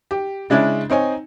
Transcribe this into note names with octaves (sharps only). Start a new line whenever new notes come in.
G4
C#3 G#3 C#4 D4 E4
C4 D#4 C#5 G#5